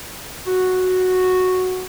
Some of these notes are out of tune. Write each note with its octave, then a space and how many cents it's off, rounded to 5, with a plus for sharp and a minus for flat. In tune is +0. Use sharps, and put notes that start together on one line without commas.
F#4 -5